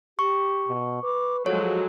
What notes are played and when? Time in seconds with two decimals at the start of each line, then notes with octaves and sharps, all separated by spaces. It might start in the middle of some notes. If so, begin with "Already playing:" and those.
0.19 G4 C#6
0.68 B2
1.03 B4 D6
1.46 F3 F#3 G#3 A4 C#5